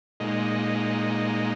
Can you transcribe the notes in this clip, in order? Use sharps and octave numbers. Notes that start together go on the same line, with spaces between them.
A#2 G#3 D#4